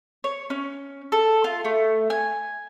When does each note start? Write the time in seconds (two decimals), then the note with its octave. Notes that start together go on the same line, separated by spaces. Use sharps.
0.24 C#5
0.50 C#4
1.12 A4
1.44 F4
1.65 A3
2.10 G#5